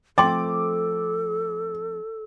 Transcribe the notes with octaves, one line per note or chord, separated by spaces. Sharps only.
F3 A3 C4 A4 D#5 G5 C6 D6